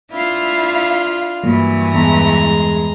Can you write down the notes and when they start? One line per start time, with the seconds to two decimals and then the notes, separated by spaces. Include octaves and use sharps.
0.11 D4 E4 F4 F5
1.43 G2 E3 F#3 A#3
1.94 E2 G#3 A5 A#5